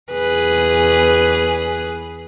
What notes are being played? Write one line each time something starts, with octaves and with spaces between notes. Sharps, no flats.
E2 G#4 B4